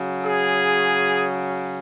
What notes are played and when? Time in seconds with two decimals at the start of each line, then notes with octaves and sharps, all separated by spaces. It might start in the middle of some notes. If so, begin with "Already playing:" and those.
Already playing: C#3 F#3
0.23 G#4